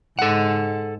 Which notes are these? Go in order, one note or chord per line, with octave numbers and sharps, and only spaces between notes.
G#2 A4 F#5